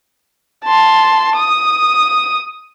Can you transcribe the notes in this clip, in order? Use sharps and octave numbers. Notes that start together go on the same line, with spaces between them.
A5 C6
D#6